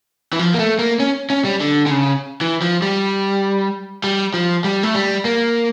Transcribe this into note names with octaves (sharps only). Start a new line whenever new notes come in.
E3
F3
A#3
A3
A#3
C#4
C#4
G3
D3
D3
C#3
E3
F3
G3
G3
F3
G3
A3
G3
A#3